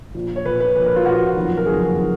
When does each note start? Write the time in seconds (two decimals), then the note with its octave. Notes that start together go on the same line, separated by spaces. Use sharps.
0.14 A#1 A#2 F3
0.36 C#5
0.45 A#1 A#2 F3 B4
0.60 B4
0.75 A#1 A#2 F3 B4
0.86 A#4
0.96 F4
1.06 A#1 A#2 F3 F#4
1.36 F#1 F2 D#3
1.57 A#4
1.66 F#1 F2 D#3 G#4
1.97 D#3